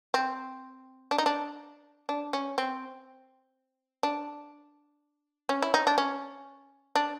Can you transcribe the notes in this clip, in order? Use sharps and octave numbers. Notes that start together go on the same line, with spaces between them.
C4
D4
D#4
D4
D4
C#4
C4
D4
C#4
E4
D#4
D4
C#4
D4